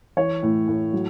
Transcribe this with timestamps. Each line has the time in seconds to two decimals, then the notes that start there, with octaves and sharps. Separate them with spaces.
0.17 E3 C#5
0.43 A2
0.68 A2
0.93 F#3